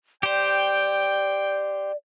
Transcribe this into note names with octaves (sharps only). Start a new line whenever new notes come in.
G4 C5 D5 G5